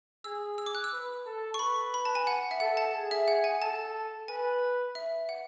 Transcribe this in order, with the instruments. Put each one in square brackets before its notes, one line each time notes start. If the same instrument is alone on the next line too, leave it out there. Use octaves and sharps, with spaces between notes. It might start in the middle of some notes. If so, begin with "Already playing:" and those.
[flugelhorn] G#4 [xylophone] E6
[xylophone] E6
D6
F#6
E6
[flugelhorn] B4
A4
[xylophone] C#6
[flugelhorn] B4 [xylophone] B5
[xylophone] B5
A5
G#5
F#5
E5
[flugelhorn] A4 [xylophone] F#5
[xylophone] A5
[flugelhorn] G#4
[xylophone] E5
F#5
G#5
[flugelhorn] A4 [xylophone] A5
[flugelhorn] B4 [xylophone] G#5
[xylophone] E5
F#5